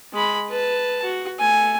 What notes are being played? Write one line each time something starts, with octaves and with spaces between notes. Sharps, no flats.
G#3 B5
B4 A5
F#4
A3 G#5